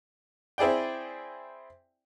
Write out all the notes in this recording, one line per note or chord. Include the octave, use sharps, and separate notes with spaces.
C4 E4 G#4 D5 G5